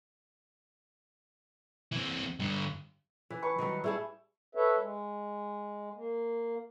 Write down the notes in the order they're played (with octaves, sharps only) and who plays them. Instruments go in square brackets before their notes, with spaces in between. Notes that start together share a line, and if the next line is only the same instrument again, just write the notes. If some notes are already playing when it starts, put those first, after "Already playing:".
[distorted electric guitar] E3 C4
G2 D3
[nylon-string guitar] E3
[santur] B4 A5 C#6
[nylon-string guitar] D#3 F#3 G3
[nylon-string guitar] G3 G#4 A5 [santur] E4
[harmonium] A4 B4 C#5 E5
G#3
A#3